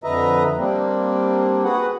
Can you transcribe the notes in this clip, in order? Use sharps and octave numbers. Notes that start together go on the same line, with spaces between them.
F2 D3 B4 D#5 E5 A#5
G3 A#3 C4 D4
F#4 G#4 B4 F#5